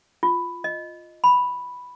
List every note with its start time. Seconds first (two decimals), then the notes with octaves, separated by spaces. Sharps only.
0.23 F4
0.64 D#5
1.24 B5